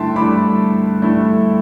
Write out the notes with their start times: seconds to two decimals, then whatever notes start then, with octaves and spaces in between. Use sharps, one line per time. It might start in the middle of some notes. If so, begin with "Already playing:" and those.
Already playing: G2 D3 A3 E4 E5 G5 A5 C6
0.16 G2 D3 A3 E4 B5 D6
1.02 G2 D3 A3 E4